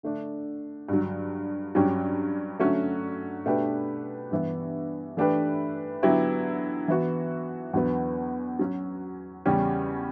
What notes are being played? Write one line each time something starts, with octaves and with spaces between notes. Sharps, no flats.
D3 A3 D4
G2 D3 F#3
G2 F#3 C#4 G4
D3 F#3 A3 C#4 F#4
B2 A3 D4 G4 B4
G2 E3 B3
E3 A3 D4 G4 B4
D3 F#3 B3 E4 G4
E3 B3 F#4
E2 D3 F#3 B3
F#3 C#4 F#4
E2 C#3 G3 C#4 G4